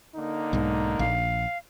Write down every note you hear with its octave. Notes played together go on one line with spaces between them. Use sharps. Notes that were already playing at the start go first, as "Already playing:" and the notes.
D3 A#3 D#4
B1 G#2
A#1 F5